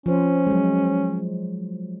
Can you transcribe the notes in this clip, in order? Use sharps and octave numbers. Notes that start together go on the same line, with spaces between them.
F3 C#4 C5
F#3 G#3